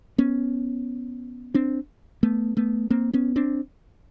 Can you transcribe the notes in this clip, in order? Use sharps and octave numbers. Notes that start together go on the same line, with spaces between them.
B3 C#4
C4 D4
A3 B3
A3 B3
A#3 C4
B3 C#4
C4 D4